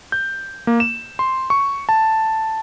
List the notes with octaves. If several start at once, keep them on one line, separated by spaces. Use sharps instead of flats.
G6
A#3
E7
C6
C#6
A5